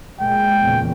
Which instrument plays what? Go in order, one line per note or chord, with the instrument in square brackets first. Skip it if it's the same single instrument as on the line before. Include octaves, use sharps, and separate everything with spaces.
[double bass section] A#2 G#3 [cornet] G5
[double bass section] E2 A#2 C#3